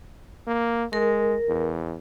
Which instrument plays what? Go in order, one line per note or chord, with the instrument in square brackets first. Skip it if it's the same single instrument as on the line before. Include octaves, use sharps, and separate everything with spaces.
[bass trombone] A#3
[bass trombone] G#3 [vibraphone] A#4
[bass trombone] E2